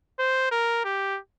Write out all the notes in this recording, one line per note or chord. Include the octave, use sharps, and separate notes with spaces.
C5
A#4
G4